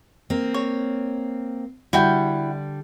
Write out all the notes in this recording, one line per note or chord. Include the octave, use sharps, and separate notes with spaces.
A#3 C4
C#5
D3 G3 E4 F#4 G5